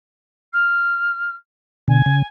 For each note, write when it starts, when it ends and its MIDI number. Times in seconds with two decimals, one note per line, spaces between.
0.53 1.35 89
1.88 2.02 47
1.88 2.02 50
1.88 2.26 80
2.06 2.23 49